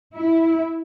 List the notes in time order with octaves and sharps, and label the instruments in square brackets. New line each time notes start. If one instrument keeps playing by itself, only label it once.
[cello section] E4